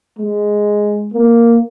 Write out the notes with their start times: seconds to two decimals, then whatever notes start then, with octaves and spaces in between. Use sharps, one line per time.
0.18 G#3
1.14 A#3